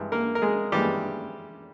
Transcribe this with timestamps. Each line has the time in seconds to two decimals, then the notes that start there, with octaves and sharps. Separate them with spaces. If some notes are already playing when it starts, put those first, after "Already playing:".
Already playing: G2 E3 G#3
0.12 A#3 A#4
0.35 A#4
0.42 G#3 G#4
0.72 G2 E3 G3 G#3 G4